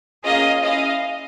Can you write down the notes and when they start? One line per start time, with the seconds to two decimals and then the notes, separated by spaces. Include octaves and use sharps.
0.24 A#3 C#4 F4 G#4 D#5 F5
0.62 C#4 E4 G#4 D#5 F5